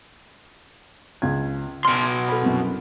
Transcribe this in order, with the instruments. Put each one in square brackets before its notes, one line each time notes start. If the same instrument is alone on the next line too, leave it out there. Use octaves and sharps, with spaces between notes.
[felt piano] C#2 C#3 G#6
[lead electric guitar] B2 C6 [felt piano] F6 D7
[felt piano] A4 B5
C2 F#2